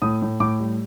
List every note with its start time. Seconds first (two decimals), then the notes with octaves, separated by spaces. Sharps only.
0.02 A2 D#6
0.22 A2
0.40 A2 D6
0.60 G3